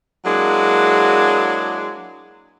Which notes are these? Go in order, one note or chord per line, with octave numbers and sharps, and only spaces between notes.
F#3 G#3 A#3 D4 E4 G#4